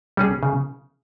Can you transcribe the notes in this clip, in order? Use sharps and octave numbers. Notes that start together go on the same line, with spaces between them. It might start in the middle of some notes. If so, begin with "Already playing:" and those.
G3 C#4 G#4
C#3